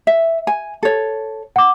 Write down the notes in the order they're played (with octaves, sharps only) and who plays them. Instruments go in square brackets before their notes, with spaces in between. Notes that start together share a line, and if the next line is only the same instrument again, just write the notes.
[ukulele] E5
G#5
A4 C#5
[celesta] F#5 D6